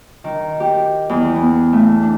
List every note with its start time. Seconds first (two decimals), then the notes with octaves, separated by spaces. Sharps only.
0.24 D#3
0.60 G4
1.09 E2
1.36 B3
1.72 A3
2.03 D4